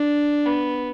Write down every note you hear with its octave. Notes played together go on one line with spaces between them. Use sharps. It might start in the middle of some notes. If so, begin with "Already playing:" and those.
Already playing: D4
B3